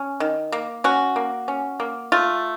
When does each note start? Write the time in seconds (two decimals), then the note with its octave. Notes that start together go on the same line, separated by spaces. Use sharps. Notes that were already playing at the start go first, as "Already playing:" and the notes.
Already playing: C#4
0.20 D#3
0.52 A#3
0.84 C#4 F#4
1.16 A#3
1.48 C#4
1.80 A#3
2.12 A3 F4